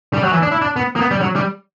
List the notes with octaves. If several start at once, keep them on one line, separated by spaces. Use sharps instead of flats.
G3
F#3
E3
D4
E4
D4
B3
A#3
B3
G3
F#3
G3